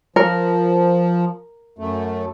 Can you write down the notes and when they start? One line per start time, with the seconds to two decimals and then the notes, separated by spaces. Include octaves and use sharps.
0.16 F3 A#4
1.79 F#2 A3